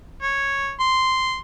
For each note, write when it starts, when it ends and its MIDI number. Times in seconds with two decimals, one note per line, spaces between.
0.22 0.72 73
0.80 1.37 84